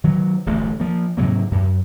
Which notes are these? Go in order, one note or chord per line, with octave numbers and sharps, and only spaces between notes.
D#3 F#3
D1 A1 G2 A3
F3 A#3
G#2 C3 F#3 A#3
F#2